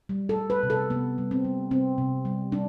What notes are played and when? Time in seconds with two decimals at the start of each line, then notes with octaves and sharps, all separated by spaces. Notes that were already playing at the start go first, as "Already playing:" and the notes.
0.09 G3
0.29 A4
0.36 G3
0.50 B4
0.63 C3
0.70 A4
0.90 C3 B3
1.18 G3
1.31 C4
1.45 G3
1.71 C3 C4
1.98 C3
2.25 G3
2.52 G3 D4